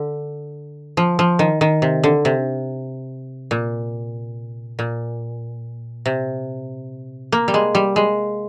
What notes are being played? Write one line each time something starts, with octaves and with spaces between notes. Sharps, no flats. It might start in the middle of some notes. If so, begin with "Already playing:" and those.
Already playing: D3
F3
F3
D#3
D#3
C3
D3
C3
A#2
A#2
C3
A#3
G3
G#3
G3
G#3